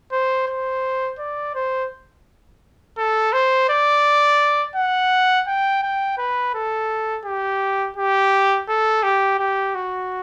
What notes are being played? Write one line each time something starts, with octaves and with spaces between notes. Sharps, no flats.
C5
C5
D5
C5
A4
C5
D5
F#5
G5
G5
B4
A4
G4
G4
A4
G4
G4
F#4